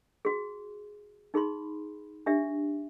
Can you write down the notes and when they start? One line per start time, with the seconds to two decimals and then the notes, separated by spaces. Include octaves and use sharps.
0.25 F#4 G#4
1.34 D#4 G#4 B5 C6
2.26 D4 G4 E5